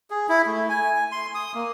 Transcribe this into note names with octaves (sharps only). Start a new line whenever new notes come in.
G#4
E4
A3
G#5
C6
D#6
A#3